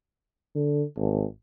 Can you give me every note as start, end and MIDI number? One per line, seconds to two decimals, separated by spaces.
0.55 0.83 50
0.97 1.24 32